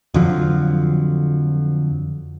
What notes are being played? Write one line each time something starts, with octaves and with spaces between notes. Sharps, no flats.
F2 D3 F3 F#3